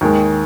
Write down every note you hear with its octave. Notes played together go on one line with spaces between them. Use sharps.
D#2 D#3 G#3